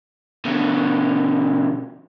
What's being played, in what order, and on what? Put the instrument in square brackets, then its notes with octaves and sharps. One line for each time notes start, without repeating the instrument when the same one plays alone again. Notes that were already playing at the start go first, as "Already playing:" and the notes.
[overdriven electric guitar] B2 D3